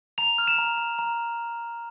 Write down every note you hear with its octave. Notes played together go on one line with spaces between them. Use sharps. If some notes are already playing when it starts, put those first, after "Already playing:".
A#5 F7
F6
E7
A#5
A#5
A#5